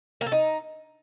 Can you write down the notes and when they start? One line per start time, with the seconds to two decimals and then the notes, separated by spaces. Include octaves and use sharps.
0.21 A#3
0.26 A4
0.32 D#4